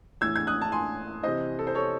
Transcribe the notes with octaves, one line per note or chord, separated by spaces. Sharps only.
A2 E3 E6 G#6
G#6
D#6 F#6
A5
G#5 C6
C3 E3 C5 D#5
A4
C5
A4 C#5